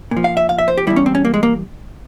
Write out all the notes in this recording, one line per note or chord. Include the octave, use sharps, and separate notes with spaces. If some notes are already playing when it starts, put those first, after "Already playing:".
A#2
F3
F5
E5
F5
E5
C5
G4
E2 E3 G3 E4
C#4
C4
C#4
A#3
G#3
A#3